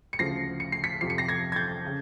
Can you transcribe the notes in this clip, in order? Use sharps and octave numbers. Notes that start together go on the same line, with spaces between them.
C#7
D2 C#3 F3 A#6 C7
C#7
C7
B6 C#7
F2 C3 F3 C7
C#7
A#6 C7
G#6 A#6
G#6
G6 A6
C#3